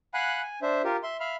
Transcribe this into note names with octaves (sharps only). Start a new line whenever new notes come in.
F5 F#5 G#5 B5 F#6
G#5
D4 C5 E5
F4 G4 A#4
E5 C6
E5 F5 B5 F6